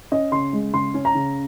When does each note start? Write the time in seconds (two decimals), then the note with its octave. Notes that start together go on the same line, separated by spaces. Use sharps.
0.12 C#4 D#5
0.32 C#3 C6
0.53 G#3
0.74 C#3 C6
0.94 C#4
1.05 A#5
1.15 C#3